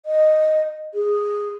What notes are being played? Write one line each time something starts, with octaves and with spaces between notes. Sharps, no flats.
D#5
G#4